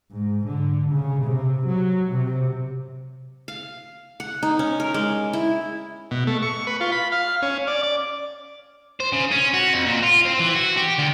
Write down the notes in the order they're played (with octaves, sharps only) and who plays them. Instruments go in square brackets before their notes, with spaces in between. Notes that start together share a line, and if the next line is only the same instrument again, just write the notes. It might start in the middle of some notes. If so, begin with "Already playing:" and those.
[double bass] G#2
D3
C#3
C3
F#3
C3
[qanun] F5
F#5
D#4
C#4
A#4
G#3
E4
[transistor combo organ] B2
A3
C#6
B4
F4
B5
F5
C#4
D5
D5
[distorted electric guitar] C5
C#3
C#4
F#4
F2
A#2
F4
C4
E3
F#4
G4
D2